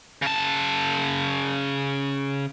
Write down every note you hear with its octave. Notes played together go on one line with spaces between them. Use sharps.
C#3 A5